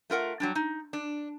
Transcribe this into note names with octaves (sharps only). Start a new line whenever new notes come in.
A3 F4 A#4 F#5
F#3 G3 D4
D#4
D4